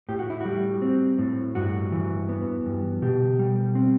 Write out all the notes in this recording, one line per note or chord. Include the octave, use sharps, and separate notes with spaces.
A2 G4
F#4
E4
G3 F#4
C4
A2
G2 F#4
E3
B3
G2
B2 G4
G3
C4